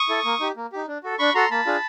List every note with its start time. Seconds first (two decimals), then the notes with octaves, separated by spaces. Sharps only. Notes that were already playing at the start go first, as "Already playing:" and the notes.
Already playing: C#6 D#6
0.09 E4 A4
0.25 A#3
0.40 D#4 G4
0.56 A#3
0.72 D#4 G4
0.88 D4
1.03 F#4 A4
1.19 D4 B5 C#6
1.35 F#4 A4 A#5 C6
1.51 A#3 A5 B5
1.66 D4 F4 G#4